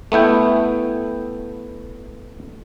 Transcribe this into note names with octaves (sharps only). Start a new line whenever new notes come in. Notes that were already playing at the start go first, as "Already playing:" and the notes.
A3 B3 E4 G5